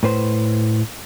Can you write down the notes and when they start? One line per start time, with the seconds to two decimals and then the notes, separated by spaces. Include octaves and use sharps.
0.03 A2 B4 C5